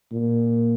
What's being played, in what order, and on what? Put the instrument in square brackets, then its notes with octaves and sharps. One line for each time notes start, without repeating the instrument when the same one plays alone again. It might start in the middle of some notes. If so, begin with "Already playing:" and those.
[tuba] A#2